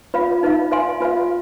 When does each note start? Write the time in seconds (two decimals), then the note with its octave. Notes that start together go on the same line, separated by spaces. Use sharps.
0.14 F4 B4 F5 B5
0.43 D#4 B4 F5
0.71 B4 F5 G#5 C6
1.01 F4 B4 F5